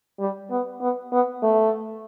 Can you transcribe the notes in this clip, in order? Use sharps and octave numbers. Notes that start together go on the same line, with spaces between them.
G3
B3
B3
B3
A3